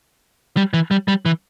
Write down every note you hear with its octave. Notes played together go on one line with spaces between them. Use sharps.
G3
E3
G3
G3
E3